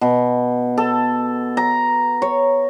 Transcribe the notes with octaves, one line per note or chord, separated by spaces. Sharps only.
B2
A4
A#5
C#5